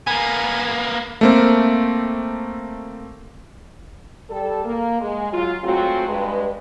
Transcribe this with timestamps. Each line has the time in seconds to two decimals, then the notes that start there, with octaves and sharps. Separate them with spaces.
0.07 A#3 B3 G#5
1.21 A3 A#3 C4
4.30 G3 A4
4.65 A#3
5.01 G#3
5.32 F#3 F4
5.64 F#3 G#3 A3 C4 F4 F#4
6.09 G2 G#3 B4